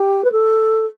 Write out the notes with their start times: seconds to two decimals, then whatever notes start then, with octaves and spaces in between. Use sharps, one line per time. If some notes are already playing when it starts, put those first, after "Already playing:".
Already playing: G4
0.24 B4
0.32 A4